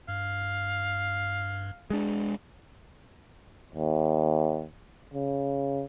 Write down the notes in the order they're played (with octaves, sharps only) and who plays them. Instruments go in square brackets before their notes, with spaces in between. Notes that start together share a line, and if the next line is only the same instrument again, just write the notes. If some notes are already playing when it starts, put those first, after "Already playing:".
[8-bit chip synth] G2 [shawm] F5
[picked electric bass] G#3 D4
[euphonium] D#2
C#3